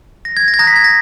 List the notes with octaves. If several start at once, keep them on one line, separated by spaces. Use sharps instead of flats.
A#6
G#6
A#6
G#6
A#5 D#6 F#6 A#6
B6
G#6
A#6